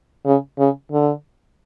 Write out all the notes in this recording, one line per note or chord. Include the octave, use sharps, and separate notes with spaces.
C#3
C#3
D3